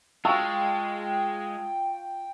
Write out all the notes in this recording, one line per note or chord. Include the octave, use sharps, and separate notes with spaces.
G#3 F4 F5 G5 A5 C#6 E6